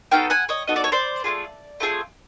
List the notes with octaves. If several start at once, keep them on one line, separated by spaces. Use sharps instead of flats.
B3 D#4 F#4 A4 F5 G5
F#5 G#5
C#5 D#5
B3 D#4 F#4 A4 D#5
D5
C#5
C5 D5
A3 C4 F4 G#4
A3 C4 F4 G#4